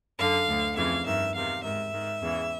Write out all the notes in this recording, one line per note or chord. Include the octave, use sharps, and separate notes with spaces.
F#2 D3 F5
D2 D3
F2 C#3 E3 F5
G2 D#3 E5
E2 C3 D#3 F5
G#2 D#3 E5
G#2 D#3
E2 C#3 E3